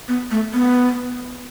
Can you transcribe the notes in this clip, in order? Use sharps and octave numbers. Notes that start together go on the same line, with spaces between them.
B3
A3
B3